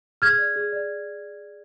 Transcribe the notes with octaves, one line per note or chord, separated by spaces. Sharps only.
G#4 F6 G#6
D5
G#4
D5